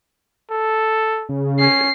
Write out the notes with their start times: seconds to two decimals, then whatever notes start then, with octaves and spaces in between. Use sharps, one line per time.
0.50 A4
1.29 C#3
1.60 C#4 C7